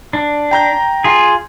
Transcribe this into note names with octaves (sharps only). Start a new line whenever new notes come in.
D4
G5 A#5 G6
F4 G#4